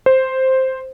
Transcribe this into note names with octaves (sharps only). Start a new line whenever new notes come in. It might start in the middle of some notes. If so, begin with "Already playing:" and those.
C5